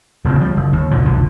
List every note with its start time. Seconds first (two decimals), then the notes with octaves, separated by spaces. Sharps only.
0.24 D#1 D2 C#3 C4
0.41 F3 G3
0.57 F#1
0.73 D#2
0.91 F#1 B1 G#2 F3
1.05 F1 B1 D3